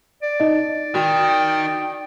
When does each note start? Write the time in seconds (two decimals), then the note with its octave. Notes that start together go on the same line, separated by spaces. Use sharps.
0.23 D5
0.40 D#4 D#5
0.95 D#3 F#4 G5